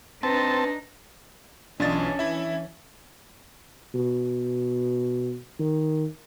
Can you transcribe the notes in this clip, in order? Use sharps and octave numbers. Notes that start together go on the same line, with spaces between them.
C4 D4 D#4 B4 A5
B1 E3 C#4 D4 F4 D#5 A6
E4 E5
B2
D#3